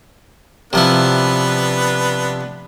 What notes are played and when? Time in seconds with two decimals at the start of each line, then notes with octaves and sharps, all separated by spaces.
0.73 C3 F3 B3 D4 E4 B4